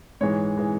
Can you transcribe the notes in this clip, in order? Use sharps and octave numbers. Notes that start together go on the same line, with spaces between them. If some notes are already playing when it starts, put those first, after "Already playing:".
G#2 E3 G#3 C#5
E3 G#3